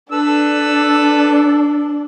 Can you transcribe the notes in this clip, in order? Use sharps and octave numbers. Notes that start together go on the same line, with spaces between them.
D4 A4 B4 E6